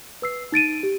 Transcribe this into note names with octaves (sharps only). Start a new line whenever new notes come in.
B4 E6 C7
D#4 A6 D7 D#7
G4